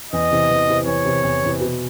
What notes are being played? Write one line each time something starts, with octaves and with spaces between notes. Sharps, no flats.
E2 D#5
C3 E3
E2
C3 E3
E2 C#5
C3 E3
E2
C3 E3
B2